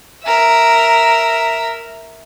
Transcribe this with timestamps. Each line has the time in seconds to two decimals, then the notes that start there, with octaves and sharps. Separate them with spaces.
0.24 A#4 E5